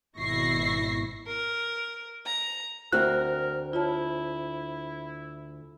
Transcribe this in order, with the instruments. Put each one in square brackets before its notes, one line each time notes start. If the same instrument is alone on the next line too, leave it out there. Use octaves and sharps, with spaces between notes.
[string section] G#1 B2 E4 C#6 A#6 C7
[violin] A#4
A#5
[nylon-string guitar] D2 C4 F#4 [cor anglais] A#4 [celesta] F#6
[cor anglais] E4 [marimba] F4 C#5 A5